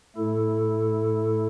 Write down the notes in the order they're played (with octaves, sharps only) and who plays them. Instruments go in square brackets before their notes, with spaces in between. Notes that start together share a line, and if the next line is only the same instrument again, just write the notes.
[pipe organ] A2 A3 E4 A4